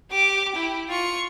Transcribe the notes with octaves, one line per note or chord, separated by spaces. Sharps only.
G4 D6
E4 G5
F4 C#6